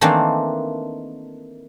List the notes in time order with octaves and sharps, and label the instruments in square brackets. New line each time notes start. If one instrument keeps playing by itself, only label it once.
[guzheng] D#3 E3 A3 A#3 C4 D4